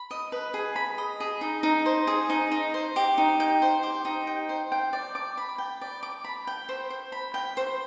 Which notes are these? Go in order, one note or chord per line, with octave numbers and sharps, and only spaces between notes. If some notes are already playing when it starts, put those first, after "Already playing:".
Already playing: B5
D#5
B4
G#4
B5
D#5
G#4
D#4
D#4
C5
G#4
D#4
D#4
C5
G4
D#4
G5
C5
G4
D#4
G5
C5
G5
D5
D6
B5
G5
D5
D6
B5
G5
C5
C5
B5
G5
C5